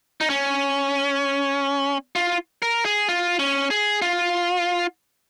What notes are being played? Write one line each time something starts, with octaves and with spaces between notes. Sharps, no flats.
D#4
C#4
F4
A#4
G#4
F4
C#4
G#4
F4